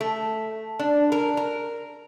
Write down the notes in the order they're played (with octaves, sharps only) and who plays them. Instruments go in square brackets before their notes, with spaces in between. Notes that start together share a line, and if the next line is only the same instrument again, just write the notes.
[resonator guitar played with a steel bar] A3
D4
A#4
A#4